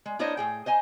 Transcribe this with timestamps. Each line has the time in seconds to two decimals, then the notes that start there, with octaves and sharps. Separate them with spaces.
0.06 G#3
0.19 A#3 D4 E4 C5 C#5 D#5
0.37 A2 G#4 G5
0.66 C5 D#5 G#5 A#5